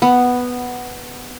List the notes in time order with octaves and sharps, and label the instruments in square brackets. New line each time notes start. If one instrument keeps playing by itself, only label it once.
[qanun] B3